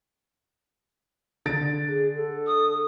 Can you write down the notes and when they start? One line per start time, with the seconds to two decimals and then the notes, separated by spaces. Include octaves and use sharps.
1.46 D3 A6 D7
1.88 G#4
2.15 A4
2.46 D#6